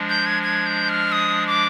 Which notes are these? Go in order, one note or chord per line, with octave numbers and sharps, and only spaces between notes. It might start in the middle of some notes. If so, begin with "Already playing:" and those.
Already playing: F3 G#3 D4
G6
G#6
G#6
G6
F6
D#6
D6